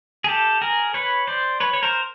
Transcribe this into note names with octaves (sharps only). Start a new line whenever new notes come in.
G#4
G4 A4
G#4 A#4
B4 C#5
C5 D5
B4 C#5
C#5
A#4 C5